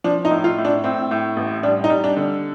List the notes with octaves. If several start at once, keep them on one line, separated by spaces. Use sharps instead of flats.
F3 D4
D#4
A2
F4
A2
D4
A2 C4
A2
A1
G3 D4
D#4
G3
D4
D3